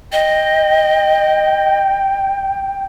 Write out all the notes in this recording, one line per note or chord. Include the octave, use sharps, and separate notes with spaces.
D#5 G5